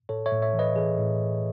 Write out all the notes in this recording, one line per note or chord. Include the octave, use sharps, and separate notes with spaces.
A2 A4 C#5
C#5 E5
A2
C#5 E5
E3
B4 D#5
E3 G#4 B4
A2